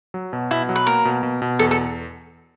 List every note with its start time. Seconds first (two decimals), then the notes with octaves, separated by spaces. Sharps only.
0.14 F#3
0.33 B2
0.51 B2 E4
0.69 F#3
0.76 B4
0.87 A#3 A#4
1.05 B2
1.23 B2
1.42 B2
1.59 E2 A4
1.71 A4